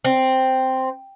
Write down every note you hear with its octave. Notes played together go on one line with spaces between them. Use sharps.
C4